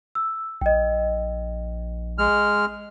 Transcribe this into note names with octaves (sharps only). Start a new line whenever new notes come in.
E6
A#1 D#5 G5
G#3 F6